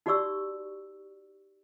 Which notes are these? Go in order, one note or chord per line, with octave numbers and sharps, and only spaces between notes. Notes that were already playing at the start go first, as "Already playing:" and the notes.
D#4 F#4 G4 D5 C#6 E6